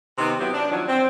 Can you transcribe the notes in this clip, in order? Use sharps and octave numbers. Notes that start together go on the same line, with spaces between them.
C3 D#3 B3 C4
F#3 B3 C4 E4 F#4 G4
D4
D#3 F3 F#3 C#4 D4
C4